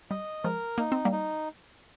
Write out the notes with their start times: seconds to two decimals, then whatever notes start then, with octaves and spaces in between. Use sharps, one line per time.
0.10 G3 D#5
0.44 F3 G#3 A#4
0.78 A#3 D#4
0.92 C4
1.05 G3 A#3
1.12 D#4